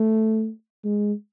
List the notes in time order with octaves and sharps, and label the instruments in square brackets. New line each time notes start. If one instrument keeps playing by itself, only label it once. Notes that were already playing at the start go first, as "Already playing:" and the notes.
Already playing: [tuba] A3
G#3